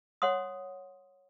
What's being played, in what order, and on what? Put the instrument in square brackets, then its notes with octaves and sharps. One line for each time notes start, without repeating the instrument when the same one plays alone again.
[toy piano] C#5 F#5 C6 D#6